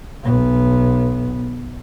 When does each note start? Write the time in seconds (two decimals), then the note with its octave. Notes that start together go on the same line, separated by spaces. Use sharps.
0.24 B1 B3